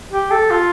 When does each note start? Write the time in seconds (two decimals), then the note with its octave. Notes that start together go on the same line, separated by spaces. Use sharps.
0.11 G4
0.31 A4
0.51 F4